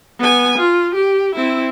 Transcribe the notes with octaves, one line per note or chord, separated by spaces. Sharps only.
B3 G#5
F4
G4
C4 E4